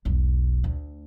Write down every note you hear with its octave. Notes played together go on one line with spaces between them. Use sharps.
E1 B1
D2